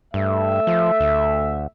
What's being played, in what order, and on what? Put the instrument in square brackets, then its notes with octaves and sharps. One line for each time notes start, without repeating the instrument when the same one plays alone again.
[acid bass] G2 [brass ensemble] A3 E5
[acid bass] F3
D2